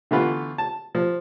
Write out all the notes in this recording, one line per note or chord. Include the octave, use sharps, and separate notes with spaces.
D3 E3 A3 B3 F4 B4
A5
F3